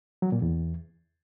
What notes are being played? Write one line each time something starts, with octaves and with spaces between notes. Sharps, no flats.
F#3
A#2
E2